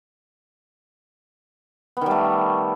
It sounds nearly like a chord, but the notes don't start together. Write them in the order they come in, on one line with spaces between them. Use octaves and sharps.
B3 D#3 G3 A3